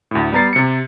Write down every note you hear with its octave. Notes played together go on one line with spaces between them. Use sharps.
D2 A2
G3 B3 A#5 A6 C7
C3 C#7